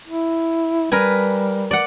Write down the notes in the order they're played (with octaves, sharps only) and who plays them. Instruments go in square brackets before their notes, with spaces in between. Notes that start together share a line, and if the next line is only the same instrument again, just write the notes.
[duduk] E4
[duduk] G3 [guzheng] A#4 B4 G#5
[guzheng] D5 F#5